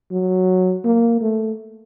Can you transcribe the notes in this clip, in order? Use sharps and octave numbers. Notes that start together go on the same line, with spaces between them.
F#3
A#3
A3